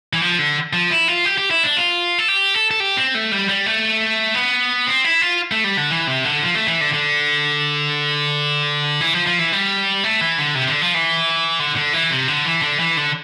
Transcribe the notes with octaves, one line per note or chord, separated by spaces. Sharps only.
E3
F3
D3
F3
E4
F4
G4
G4
E4
D4
F4
A4
G4
A4
A4
G4
C4
A3
G3
G3
A3
B3
C4
E4
F4
A3
G3
D3
E3
C3
D3
F3
A3
E3
D3
D3
E3
F3
F3
E3
G3
A3
E3
D3
C3
D3
F3
E3
D3
D3
E3
C3
D3
E3
D3
E3
D3